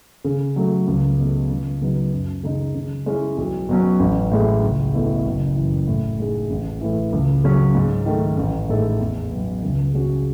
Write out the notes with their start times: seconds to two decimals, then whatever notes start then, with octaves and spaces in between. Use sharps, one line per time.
0.24 C#3
0.56 F#3 A3
0.87 C#2
1.19 B2 A3
1.50 C#2
1.81 C#3 F#3 B3 D#4
2.12 F#2
2.43 C#3 G#3 D#4
2.75 C#3
3.06 G#3 C#4 E4
3.38 B1
3.69 B2 F#3 C#4
4.00 A1
4.31 A2 G#3
4.63 C#2
4.94 B2 A3 E4
5.25 F#1
5.56 F#2 E3
5.87 A2
6.19 G#3 D#4 G#4
6.50 A1
6.81 A2 E3
7.13 C#2
7.44 C#3 F#3 C#4
7.75 G#2
8.06 D#3 A3
8.37 A1
8.69 A2 G#3 D#4 A4
9.00 E2
9.31 B2 F#3
9.63 C#2
9.94 C#3 G#3 C#4 F#4